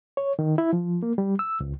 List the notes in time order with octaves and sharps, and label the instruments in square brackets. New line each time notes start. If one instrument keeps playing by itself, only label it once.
[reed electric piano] C#5
D#3
E4
F3
A#3
G3
E6
C#2